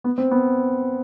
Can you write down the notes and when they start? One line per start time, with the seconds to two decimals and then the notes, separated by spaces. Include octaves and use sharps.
0.04 B3
0.18 C4
0.31 B3